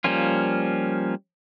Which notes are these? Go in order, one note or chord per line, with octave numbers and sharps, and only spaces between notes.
F3 G3 A#3 C#4 F4